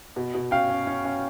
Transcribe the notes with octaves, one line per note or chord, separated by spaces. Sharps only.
B2
B2
C#4 F5 G5
C#4
C#4
C#4